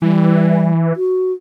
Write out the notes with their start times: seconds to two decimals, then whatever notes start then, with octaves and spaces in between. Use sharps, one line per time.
0.02 E3 G3
0.96 F#4